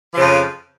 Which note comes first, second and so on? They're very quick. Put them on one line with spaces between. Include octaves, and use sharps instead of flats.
F3 C#3 F2